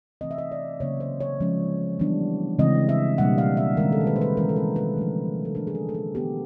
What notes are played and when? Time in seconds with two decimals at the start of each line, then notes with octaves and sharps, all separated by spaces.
0.21 C3 E3 A3 C4 D#5
0.31 E5
0.38 D#5
0.52 D5
0.80 C#3 F#3 A#3 C#4 C#5
1.00 C5
1.20 C#5
1.40 F3 G#3 C#4
1.99 E3 G3 B3 D4
2.59 C#3 E3 G#3 C4 D#5
2.89 E5
3.18 B2 G3 A#3 D4 F#5
3.38 F5
3.57 E5
3.77 D#3 G#3 C#4 A#4
3.92 A4
4.01 A#4
4.07 B4
4.16 C5
4.21 B4
4.37 E3 G#3 C#4 A#4
4.49 A4
4.56 A#4
4.76 B4
4.97 F3 A3 D4
5.45 A4
5.55 E3 A3 D4 A#4
5.67 G#4
5.75 A4
5.89 A4
5.94 G#4
6.15 D#3 G#3 B3 G4